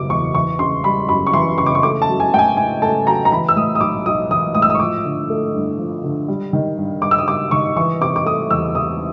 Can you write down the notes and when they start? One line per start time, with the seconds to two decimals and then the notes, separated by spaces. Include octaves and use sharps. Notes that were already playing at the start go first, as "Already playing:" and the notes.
Already playing: F#1 B2 G3 D6
0.10 E2 C#6
0.35 E3 C#6
0.59 C#3 C6
0.84 G3 B5
1.09 F#2 B5
1.27 C#6
1.33 E3 C6
1.58 C#3 C#6
1.66 D6
1.75 C#6
1.83 A3 D6
2.02 A5
2.08 F#3
2.20 G#5
2.33 A2 G5
2.39 G#5
2.57 A2 G#5
2.82 A3 A5
3.06 F#3 A#5
3.25 A#5
3.32 E3 B5
3.49 E6
3.56 A2 D#6
3.75 D#6
3.80 B1 D6
4.06 B1 D#6
4.31 E3 D#6
4.55 A2 D#6
4.62 E6
4.70 D#6
4.75 C#6
4.80 F3 D6
5.05 D3
5.30 A3
5.55 G2
5.78 F3
6.03 D3
6.28 G3
6.53 D#3
6.77 G2
7.02 G2 D6
7.11 E6
7.18 D#6
7.27 G3 D6
7.51 D#3 C#6
7.76 E3 C#6
8.01 C3 D6
8.16 D6
8.26 A3 D#6
8.50 E2 E6
8.75 E3 D#6